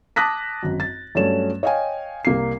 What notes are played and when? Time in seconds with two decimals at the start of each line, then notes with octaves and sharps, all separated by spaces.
0.16 A5 D6 D#6 F#6 A#6 B6
0.63 G#1 F#2
0.80 A6
1.15 G2 F#3 A3 C#4 C#5 E7
1.63 C#5 D#5 F5 G5 G#5
2.25 C2 A#3 C7